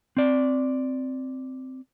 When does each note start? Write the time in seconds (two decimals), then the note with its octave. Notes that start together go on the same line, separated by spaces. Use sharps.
0.17 C4 D5